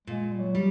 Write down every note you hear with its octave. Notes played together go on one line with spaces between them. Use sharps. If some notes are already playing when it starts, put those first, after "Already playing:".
A#2 G#3
G3
F#3
G3